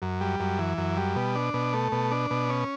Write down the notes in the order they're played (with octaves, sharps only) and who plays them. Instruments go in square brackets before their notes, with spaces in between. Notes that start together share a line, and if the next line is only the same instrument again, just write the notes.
[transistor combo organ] F#2
G3
F#2
E3
F#2
G3
B2
D4
B2
A3
B2
D4
B2
C#4